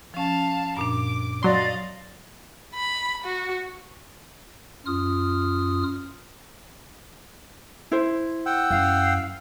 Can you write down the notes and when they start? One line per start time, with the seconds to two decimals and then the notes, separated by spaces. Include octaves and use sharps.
0.14 F3 C#4 F5 A5
0.77 F#2 A#2 D4 D6
1.43 F#3 D5 D#5 F5 C6
2.75 B5
3.24 F#4
4.86 F#2 F4 D#6 F6
7.91 E4 C5
8.46 F#5 G5 E6
8.71 F#2 F5